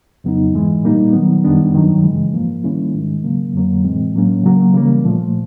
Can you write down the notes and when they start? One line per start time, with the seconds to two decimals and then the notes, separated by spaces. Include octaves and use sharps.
0.24 F2 C#3 F#3 B3 D#4
0.53 G#2 E3 G#3
0.83 A#2 G3 A#3 D#4
1.13 D#3 F#3 B3
1.44 F#2 D#3 G3 B3 D4
1.74 G2 D#3 F#3
2.04 F#2 C#3 E3 G#3
2.34 G#2 F3 A#3
2.64 D#3 G3 A#3 C#4 E4
2.95 G#2 D#3 G#3
3.24 C#3 F#3 A#3
3.54 F2 D3 F#3 A#3
3.84 A2 E3 G#3 C4
4.14 A2 F#3 A#3 C#4
4.44 C#3 F#3 A#3
4.74 C#3 E3 G3 A#3
5.05 A#2 F3 A3